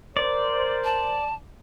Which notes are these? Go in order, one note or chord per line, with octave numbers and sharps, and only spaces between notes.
A#4 C5 D5
A5